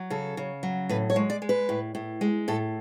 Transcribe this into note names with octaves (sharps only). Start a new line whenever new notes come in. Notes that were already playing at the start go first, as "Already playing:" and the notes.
Already playing: F#3
C#3 A4
C#3
F#3
A2 B4
C#5
G#3
D5
G#3
B4
A2
A2
G#3
A2 A4